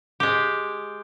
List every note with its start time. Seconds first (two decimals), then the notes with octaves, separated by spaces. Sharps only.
0.20 G#3 G4